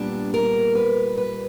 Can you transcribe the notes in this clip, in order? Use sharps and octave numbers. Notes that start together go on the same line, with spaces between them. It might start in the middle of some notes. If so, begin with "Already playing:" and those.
Already playing: A#2 G3 B3 D4
A#4
B4
B4